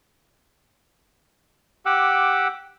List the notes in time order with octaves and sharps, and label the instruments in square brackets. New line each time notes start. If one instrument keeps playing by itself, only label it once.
[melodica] G4 F#5 D6 E6